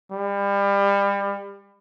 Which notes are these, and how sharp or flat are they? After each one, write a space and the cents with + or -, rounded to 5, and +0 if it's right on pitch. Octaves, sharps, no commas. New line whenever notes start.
G3 +30